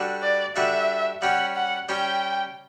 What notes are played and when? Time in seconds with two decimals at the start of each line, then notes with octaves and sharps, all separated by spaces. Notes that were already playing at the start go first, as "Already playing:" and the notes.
Already playing: G3 D4 F#4 A4
0.22 D5
0.56 G3 D4 F#4 A4 E5
1.22 G3 C#4 G4 F#5
1.56 F#5
1.89 G3 C#4 G4 G5